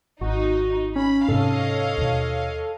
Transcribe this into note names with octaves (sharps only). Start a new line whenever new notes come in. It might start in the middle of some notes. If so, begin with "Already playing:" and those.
G#1 D#4 F#4
C#4 B5
G#2 C3 C#4 A4 C#5 D#5 F5
D#2 B2